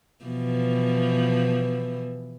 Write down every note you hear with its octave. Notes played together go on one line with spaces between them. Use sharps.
B2 E3 F3